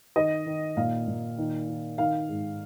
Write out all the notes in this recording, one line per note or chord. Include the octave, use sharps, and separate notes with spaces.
D#3 D#5
D#3
A#2 F5
A#2
D#3
D#3
D#3 F5
G#2